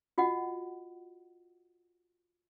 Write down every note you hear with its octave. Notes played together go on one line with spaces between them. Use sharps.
F4 F#4 D#5 F#5